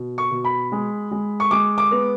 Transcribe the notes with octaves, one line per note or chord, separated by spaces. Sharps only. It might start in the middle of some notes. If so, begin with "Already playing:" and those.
Already playing: B2
C#6
B2
B5
G#3
G#3
C#6
G#3 D6
D6
B3